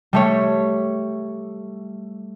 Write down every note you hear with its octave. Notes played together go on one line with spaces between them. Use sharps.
G3 A3 C#5